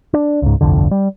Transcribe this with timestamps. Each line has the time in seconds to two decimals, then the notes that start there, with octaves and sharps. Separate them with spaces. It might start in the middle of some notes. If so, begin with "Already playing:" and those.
0.14 D4
0.42 C#2 G#2
0.61 G1 C2 F2 D3
0.91 G3